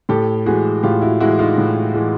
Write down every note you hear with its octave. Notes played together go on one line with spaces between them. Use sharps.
A2 G4 A4
E3 G#3 F#4 G#4
A2 F4 G4
E4 F#4
E3 G#3 E4 F#4
D#4 F4
A2
E3 G#3